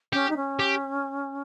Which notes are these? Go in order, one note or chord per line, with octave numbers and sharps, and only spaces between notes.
C#4 G4
D#4
C#4
G4